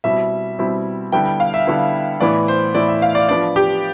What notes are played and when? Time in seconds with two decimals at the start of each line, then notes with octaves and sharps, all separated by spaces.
0.04 B2 G3 C4 E4 E5
0.59 B2 G3 C4 E4
1.12 D3 G3 B3 E4 G5
1.26 G5
1.40 F5
1.54 E5
1.67 D3 G3 B3 E4
2.20 A2 E3 B3 E4 D5
2.48 C5
2.75 A2 E3 B3 E4 D5
2.88 E5
3.02 F5
3.15 D5
3.29 F3 B3 D4 D5
3.56 G4